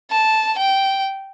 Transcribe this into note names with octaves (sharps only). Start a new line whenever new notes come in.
A5
G5